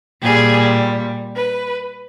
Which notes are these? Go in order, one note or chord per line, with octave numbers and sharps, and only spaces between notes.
A#2 G3 G#4
B4